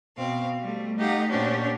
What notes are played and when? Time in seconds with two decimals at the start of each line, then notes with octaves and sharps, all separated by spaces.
0.17 B2 C4 F5
0.59 G3 A3
0.98 A3 D#4 G4 F5 F#5
1.30 A#2 C#4 D4 F#4 G4 C5